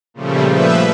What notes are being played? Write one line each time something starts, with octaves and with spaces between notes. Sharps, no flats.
A#2 C#3 F3 G3 A3
F3 B4 E5